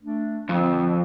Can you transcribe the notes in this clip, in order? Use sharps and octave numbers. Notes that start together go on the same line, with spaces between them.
A3 D4
F2 D3 F3 C4